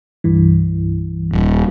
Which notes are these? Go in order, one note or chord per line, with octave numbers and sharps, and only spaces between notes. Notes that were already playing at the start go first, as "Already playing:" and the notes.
C2 G2 E3
D#1